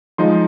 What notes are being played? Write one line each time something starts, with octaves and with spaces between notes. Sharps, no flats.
F3 G#3 D#4 C6